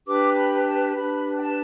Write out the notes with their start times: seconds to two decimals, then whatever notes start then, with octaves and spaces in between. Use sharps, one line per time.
0.06 D4 G4 B4 D6
0.36 B5
0.66 A5
0.96 D4 G4 B4 B5
1.37 G5
1.42 A5